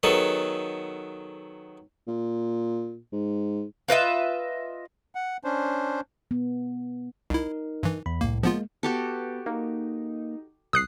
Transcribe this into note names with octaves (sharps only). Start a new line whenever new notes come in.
D#3 F#3 B3 G#4 A4
A#2
G#2
F4 B4 D#5 E5
F#5
C#4 D4 C5
B3
C2 D#4 E4 A#4
G2 E3
E2 B5
C2 A2 A#3
F3 G#3 A#3 B3 F4
B3 F#4 G4 A4
A#3 D#4
C2 D#6 F#6 C7